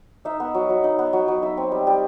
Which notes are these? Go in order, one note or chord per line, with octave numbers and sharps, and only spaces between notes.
D#4 E5
B3
F#3
F#3
D#4
B3
F#3
F#3
D#4 E5
C4
G3
G3